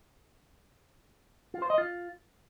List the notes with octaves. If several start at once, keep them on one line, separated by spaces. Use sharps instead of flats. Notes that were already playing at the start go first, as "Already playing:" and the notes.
F4
C5
D#5
F4